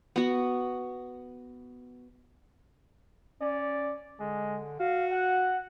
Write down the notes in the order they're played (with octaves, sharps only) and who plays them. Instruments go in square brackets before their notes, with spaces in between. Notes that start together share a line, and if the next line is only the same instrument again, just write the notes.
[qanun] B3 F#4
[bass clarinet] C#4 [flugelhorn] D5
[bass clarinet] D3 [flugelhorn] G#3
[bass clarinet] F#4 [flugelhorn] F5
[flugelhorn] F#5